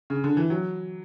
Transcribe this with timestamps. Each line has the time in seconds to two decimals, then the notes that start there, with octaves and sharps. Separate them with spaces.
0.10 C#3
0.24 D3
0.37 E3
0.50 F#3